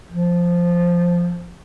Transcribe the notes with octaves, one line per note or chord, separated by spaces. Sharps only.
F3